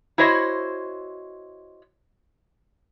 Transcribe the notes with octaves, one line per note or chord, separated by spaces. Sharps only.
E4 F#4 C5 C#5 D#5